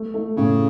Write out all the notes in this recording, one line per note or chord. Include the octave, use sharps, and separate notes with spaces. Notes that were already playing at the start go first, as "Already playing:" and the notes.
Already playing: A3
A3
A2 C#3